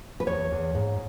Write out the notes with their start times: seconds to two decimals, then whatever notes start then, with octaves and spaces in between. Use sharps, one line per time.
0.20 B4
0.27 E2 C#5
0.51 E2
0.75 G#2